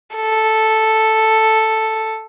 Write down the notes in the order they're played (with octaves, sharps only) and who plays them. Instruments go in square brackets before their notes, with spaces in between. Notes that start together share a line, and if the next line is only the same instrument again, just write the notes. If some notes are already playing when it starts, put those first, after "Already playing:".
[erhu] A4